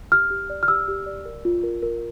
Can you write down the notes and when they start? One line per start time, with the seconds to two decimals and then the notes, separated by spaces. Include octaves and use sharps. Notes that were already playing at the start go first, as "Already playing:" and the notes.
0.12 G4 F6
0.30 G4
0.50 D5
0.63 F6
0.68 G4 E6
0.88 G4
1.06 D5
1.25 A#4
1.45 F4
1.64 A#4
1.83 A#4